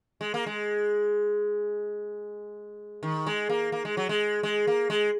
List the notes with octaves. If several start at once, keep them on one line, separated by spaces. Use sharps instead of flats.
G#3
A#3
G#3
D#3
G#3
A#3
A#3
G#3
F#3
G#3
G#3
A#3
G#3